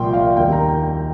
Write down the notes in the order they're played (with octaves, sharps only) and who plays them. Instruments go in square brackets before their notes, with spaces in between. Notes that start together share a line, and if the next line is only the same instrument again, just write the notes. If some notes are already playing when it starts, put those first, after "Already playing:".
Already playing: [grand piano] C2 A#2 F3 G5 C6
F5
D#2 D#3 G3 G5
A#5
G5
G5